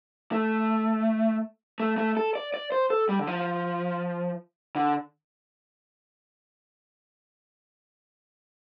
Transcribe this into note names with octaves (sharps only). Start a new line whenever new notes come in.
A3
A3
A3
A4
D5
D5
C5
A4
G3
D3
F3
D3